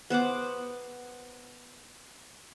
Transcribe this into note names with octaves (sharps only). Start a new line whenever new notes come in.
B3 C5 F#5 D6